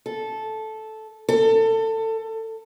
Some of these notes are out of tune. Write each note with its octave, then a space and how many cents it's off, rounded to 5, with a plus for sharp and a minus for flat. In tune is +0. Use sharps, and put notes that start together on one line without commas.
A4 -10
A4 +25